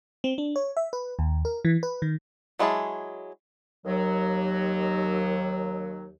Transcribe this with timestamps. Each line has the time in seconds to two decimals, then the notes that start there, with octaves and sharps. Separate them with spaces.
0.24 C4
0.38 D4
0.56 C#5
0.77 E5
0.93 B4
1.19 D#2
1.45 A#4
1.65 E3
1.83 B4
2.02 D#3
2.59 F#3 G#3 E4 G#4 A5
3.86 D#2 F#3